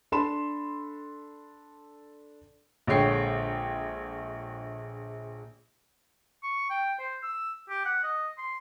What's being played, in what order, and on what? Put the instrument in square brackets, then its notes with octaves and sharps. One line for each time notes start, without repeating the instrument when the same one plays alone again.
[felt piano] D4 A4 B5 C6 E7
[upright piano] A#1 D3 G#3 C#5 G5 C7
[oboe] C#6
G5
C5
E6
G4
F#5
D#5
C6